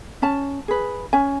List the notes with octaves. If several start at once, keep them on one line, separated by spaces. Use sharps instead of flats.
C#4 A5
G#4 B4
C#4 G#5